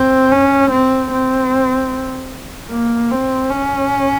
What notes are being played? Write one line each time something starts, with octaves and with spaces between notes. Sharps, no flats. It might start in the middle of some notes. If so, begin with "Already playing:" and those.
Already playing: C4
C#4
C4
C4
A#3
C4
C#4